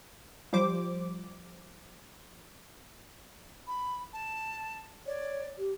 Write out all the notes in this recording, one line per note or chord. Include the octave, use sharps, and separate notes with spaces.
F3 G3 C5 D6
B5
A5
C#5 D5
G4